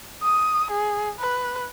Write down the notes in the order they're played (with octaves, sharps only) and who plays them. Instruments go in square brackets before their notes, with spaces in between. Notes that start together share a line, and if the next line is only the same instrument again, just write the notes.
[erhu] D#6
G#4
B4